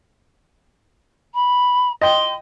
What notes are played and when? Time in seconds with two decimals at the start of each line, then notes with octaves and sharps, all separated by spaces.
1.34 B5
2.01 D#5 G5 C6